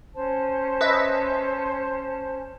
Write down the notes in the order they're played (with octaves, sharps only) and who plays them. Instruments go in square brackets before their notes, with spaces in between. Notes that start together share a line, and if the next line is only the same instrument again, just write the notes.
[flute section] C#4 C5 A5
[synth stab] B4 D#5 E5